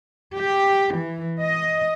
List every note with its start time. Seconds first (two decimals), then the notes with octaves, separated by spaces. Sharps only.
0.36 G4
0.95 E3
1.41 D#5